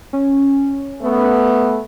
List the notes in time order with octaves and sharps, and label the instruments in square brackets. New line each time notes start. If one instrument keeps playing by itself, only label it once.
[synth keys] C#4
[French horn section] A3 B3